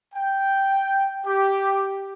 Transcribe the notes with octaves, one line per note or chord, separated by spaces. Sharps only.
G5
G4